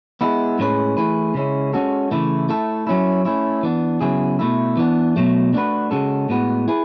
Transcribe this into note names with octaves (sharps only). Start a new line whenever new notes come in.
G#3 B3 E4
A2 G#3 C#4 G#4 B4
E3 A3 E4 G#4 B4
C#3 G#3 C#4 E4
G#3 C#4 F#4 A4
C#3 E3 A3 E4
A3 E4 A4
F#3 C#4 E4
A3 C#4 E4
E3 B3 D4
C#3 F#3 B3 E4 G#4
B2 A3 E4
E3 B3 D4
B2 F#3 A3
A3 D4 F#4 B4
C#3 G#3 C#4 F#4 A4
A2 G#3 B3 F#4 B4
E4 G#4 B4